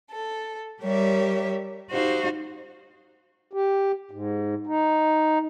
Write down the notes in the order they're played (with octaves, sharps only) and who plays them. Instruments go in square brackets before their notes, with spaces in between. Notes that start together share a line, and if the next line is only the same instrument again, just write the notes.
[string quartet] A4
G3 G4 A#4 C#5 E5
D#4 F#4 G4 C5 F5
[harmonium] G4
G#2
D#4